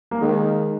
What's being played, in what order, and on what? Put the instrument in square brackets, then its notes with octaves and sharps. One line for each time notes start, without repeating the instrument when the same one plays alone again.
[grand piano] A#3
[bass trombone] D#3 [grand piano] G#3